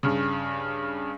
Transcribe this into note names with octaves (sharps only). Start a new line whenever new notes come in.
G2 C#3